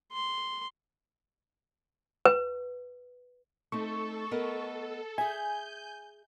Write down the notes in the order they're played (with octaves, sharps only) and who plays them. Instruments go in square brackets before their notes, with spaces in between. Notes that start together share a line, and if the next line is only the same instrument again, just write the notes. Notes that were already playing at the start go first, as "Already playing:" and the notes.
[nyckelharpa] C6
[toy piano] B4
[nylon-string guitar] A3 C4 D#4 [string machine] A4 [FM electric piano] C#6
[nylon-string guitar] B3 A#4 D#5
[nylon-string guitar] G#4 E5 [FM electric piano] G#5 [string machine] G6